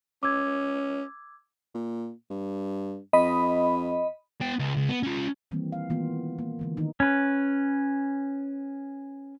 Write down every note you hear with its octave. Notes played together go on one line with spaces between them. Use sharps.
C#4 D6 E6 G#6
A#2
G2
F2 D#5 B5
B3 G5
C#2
C#2
B3
C#4 F4
D#3 E3 G3 A#3 C4
F5
D#3 E3 G#3 A#3 B3 F4
A#3
D3 E3 G#3
D#3 D#4
C#4 B4